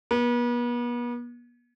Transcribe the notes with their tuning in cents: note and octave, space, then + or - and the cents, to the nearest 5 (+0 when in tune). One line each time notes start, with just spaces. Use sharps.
B3 -40